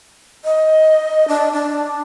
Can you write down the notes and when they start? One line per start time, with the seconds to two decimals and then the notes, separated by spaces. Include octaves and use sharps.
0.45 D#5
1.28 D4
1.53 D4